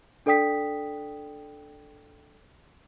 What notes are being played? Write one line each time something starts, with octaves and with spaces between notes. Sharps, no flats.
D4 A4 D5 G5 D#6 B6